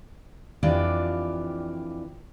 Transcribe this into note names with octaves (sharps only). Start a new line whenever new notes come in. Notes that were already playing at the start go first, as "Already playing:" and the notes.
F2 E3 D4 F4 G4 D5